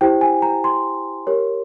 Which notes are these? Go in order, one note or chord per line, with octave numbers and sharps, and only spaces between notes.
E4 G4 C5 G5
G#5
A#5
C6
G4 A#4 C#5